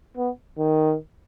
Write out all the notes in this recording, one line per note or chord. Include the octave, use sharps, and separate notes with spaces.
B3
D#3